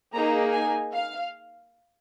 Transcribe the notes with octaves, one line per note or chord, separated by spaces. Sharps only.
A#3 D#4 G#4 A#5
G#5
F5